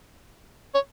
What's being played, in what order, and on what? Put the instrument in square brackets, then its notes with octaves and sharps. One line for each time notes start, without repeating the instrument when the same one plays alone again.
[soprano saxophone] C#5